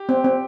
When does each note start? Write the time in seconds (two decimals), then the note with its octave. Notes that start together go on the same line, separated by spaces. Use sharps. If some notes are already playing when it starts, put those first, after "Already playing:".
Already playing: G4
0.09 C4
0.24 C4